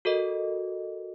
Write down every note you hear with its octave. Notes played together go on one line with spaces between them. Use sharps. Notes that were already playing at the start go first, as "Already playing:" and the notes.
F#4 A4 A#4 D#5